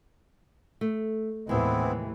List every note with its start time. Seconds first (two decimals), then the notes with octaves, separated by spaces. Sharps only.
0.81 A3
1.49 D#2 A2 C3 E3 G#3 B3 C4 E4